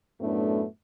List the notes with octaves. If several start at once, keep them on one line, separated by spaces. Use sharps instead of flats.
F#2 A2 A3 B3 D4